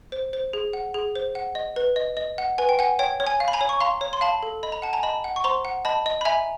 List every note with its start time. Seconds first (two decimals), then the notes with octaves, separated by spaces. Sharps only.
0.12 C5
0.33 C5
0.53 G#4
0.73 F#5
0.94 G#4
1.15 C5
1.35 F#5
1.55 D#5
1.76 B4
1.96 D#5
2.17 D#5
2.38 F#5
2.58 B4 G#5
2.69 G5
2.79 F#5 G#5
2.99 C#5 G5
3.20 C#5
3.27 G#5
3.40 F5
3.48 B5
3.53 G#5 A#5
3.61 C#5
3.69 C#6
3.80 F5 A#5 C6
4.01 C#5
4.13 C6
4.21 F5 A5 B5
4.43 A4
4.63 D#5 B5
4.72 A#5
4.82 F#5 A5
4.93 G#5 A#5
5.03 D#5 A5 B5
5.24 F#5
5.36 C#6
5.44 C5 A#5 C6
5.65 F#5
5.85 D#5 A5 B5
6.06 D#5
6.21 B5
6.25 E5 G#5 A#5